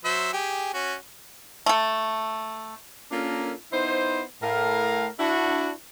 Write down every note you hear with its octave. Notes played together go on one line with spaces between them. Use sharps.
F#3 C5 E5
G4 G#4
C#4 F#4
A3 A4
A#3 C#4 D4 F4 A4 A#4
B3 D#4 E4 C5
A2 A#4 F5
D4 E4 F#4